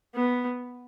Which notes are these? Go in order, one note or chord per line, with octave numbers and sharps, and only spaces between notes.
B3